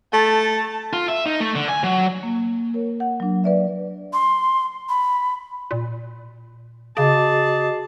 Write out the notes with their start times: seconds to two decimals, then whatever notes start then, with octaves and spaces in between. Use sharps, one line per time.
0.13 A3 A5
0.93 F4
1.08 E5
1.26 D#4
1.40 A3
1.55 D3
1.69 G#5
1.83 F#3
2.23 A#3
2.74 A#4 C#5
3.00 F#5
3.20 F#3 D4
3.44 B4 D5 E5
4.13 C6
4.89 B5
5.71 A#2
6.97 C#3 F#4 G#4 D#5 A5 D6